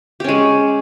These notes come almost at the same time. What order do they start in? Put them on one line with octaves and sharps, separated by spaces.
G4 C#4 G#3